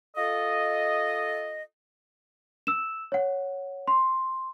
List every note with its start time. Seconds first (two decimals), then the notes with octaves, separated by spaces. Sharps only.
0.16 F4 A4 D#5
2.67 E6 E7
3.12 C#5 F#5
3.88 C6